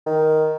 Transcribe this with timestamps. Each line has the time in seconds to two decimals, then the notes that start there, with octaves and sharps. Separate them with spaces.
0.06 D#3